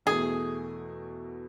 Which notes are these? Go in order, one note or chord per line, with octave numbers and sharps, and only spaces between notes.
E2 B2 A3 G#4